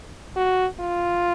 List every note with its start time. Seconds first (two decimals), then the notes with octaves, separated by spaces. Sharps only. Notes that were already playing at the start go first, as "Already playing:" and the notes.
0.36 F#4
0.80 F4